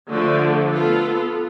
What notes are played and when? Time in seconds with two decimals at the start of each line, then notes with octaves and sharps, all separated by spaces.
0.10 D3 F3 A3
0.71 B3 F4 A4